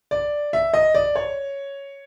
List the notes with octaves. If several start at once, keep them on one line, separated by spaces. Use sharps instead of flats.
D5
E5
D#5
D5
C#5